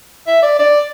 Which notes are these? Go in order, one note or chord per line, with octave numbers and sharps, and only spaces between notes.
E5
D5
D5